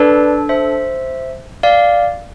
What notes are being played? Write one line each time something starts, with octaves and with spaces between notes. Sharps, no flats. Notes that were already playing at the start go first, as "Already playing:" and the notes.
Already playing: D4 A4 B4 D5
C5 E5
D5 F5